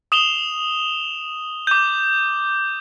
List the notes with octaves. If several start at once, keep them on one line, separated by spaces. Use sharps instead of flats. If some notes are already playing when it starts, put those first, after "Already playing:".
D#6 E7 F7 G7
D6 G6